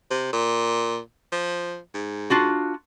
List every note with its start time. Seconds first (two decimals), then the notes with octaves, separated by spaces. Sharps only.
0.10 C3
0.33 A#2
1.32 F3
1.94 G#2
2.30 D4 F4 F#4